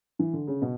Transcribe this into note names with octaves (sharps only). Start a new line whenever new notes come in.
E3
D3
C#3
B2